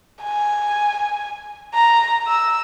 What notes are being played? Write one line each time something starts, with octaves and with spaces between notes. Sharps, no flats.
G#5
A#5
E6